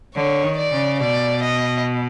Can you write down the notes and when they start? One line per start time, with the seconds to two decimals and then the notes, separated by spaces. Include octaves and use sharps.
0.15 D3 C#5
0.43 D#3
0.58 D5
0.72 C#3
1.00 B2 D5
1.42 D#5